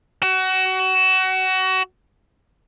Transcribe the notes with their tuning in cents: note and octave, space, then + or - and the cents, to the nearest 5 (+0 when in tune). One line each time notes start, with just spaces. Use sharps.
F#4 +25